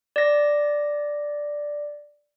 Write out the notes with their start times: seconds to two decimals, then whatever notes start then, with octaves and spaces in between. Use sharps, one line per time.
0.16 D5 A#6